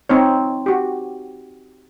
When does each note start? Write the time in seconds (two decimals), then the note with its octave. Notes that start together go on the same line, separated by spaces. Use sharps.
0.09 C4 D#4 C#5
0.66 F#4 G4